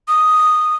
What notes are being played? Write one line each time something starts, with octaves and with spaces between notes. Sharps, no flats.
D#6